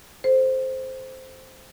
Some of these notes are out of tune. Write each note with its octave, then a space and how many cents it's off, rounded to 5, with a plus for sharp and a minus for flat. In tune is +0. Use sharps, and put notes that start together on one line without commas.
A4 -30 C5 +0